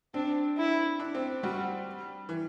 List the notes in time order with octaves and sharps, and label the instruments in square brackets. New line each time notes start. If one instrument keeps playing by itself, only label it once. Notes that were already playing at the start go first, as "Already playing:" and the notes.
[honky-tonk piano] C4 [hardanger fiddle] D4
[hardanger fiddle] E4
[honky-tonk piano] D4
C4
[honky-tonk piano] G3 [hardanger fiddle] F#4
[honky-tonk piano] E3